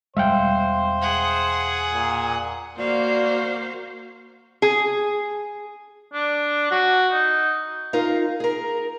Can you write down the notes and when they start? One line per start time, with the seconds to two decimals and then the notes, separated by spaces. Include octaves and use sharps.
0.17 E1 G3 G#3 C5 E5 F5 G5
1.01 G#4 F#5
1.94 A#2
2.78 A#3 F#4 C5 D5 F5
4.62 G#4
6.13 D4
6.71 F#4
7.12 D#4
7.93 D#4 F4 A#4 F5
8.40 G#4 A#4